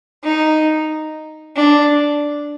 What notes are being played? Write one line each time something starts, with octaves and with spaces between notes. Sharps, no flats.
D#4
D4